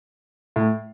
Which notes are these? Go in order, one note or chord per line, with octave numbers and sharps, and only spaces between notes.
A2